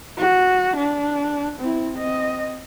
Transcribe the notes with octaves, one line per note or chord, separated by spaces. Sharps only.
F#4
D4
C4 E4
C4 D#5